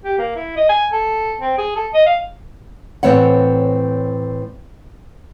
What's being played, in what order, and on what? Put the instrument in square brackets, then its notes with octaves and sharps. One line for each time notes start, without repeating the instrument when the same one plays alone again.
[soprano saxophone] G4
A#3
E4
D#5
G#5
A4
C4
G#4
A4
D#5
F5
[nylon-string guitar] A2 E3 C4 C#5 F#5